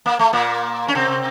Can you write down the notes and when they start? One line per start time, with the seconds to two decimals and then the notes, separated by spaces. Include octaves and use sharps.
0.06 A#3
0.19 A3
0.33 A#2 A#3
0.88 C#4
0.95 C3 C4